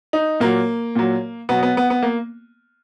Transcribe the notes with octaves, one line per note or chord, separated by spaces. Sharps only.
D#4
A#2 F#3 A#3
A#2 F#3
B2 F#3 B3
B3
B3
B3
A#3